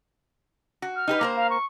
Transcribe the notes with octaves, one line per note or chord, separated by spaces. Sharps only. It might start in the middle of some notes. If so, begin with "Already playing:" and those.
F#4
F6
D#4 G4 B4
A#3 A#4 C5
F5
C#6